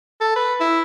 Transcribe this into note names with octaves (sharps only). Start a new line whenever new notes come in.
A4
B4
E4